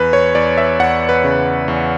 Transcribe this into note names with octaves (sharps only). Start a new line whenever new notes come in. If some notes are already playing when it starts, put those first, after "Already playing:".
Already playing: E2 B4
C#5
E2 D5
E5
E2 F#5
B4
C#3
E2